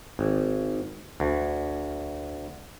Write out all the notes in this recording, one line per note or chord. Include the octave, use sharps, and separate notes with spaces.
G#1
D2